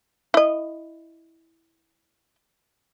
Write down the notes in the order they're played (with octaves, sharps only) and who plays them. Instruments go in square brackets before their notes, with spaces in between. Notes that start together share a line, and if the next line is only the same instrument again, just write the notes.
[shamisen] E4 D#5